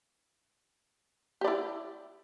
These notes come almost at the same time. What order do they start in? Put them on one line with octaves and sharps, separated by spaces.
G4 D5 E4